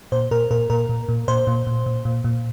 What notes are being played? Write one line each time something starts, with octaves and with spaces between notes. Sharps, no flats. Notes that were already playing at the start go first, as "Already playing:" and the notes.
A#2 C5
A#2 A#4
A#2 A#4
A#2 A#4
A#2
A#2
A#2 C5
A#2
A#2
A#2
A#2
A#2